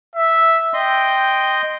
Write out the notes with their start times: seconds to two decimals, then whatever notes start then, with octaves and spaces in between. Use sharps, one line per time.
0.16 E5
0.74 D#5 G5 C6